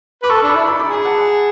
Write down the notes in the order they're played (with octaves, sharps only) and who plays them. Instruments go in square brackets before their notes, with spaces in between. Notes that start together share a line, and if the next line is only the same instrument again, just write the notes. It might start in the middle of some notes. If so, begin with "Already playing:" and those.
[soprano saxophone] B4 [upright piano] D6
[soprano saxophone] A4 [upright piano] C#6 E6
[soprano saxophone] D4 [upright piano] E6
[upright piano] B5 D6
[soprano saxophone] E4
[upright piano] B5 D6
B5 D6
[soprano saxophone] G#4
[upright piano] G#5 B5
F#5 A5